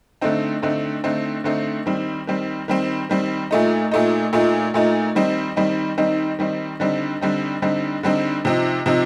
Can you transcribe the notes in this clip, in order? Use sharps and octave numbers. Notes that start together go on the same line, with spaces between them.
D3 A3 C4 D#4
D3 A3 C4 D#4
D3 A3 C4 D#4
D3 A3 C4 D#4
D#3 G3 C4
D#3 G3 C4
D#3 G3 C4
D#3 G3 C4
A#2 A3 D#4
A#2 A3 D#4
A#2 A3 D#4
A#2 A3 D#4
D#3 G3 C4 D#4
D#3 G3 C4 D#4
D#3 G3 C4 D#4
D#3 G3 C4 D#4
D3 G3 C4 D#4
D3 G3 C4 D#4
D3 G3 C4 D#4
D3 G3 C4 D#4
C3 F3 C4 D#4
C3 F3 C4 D#4